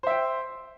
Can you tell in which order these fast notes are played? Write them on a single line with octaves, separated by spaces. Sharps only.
C5 E5 G5